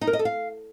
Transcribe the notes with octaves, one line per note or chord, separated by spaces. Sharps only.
D#4
A#4
D#5
A4
F5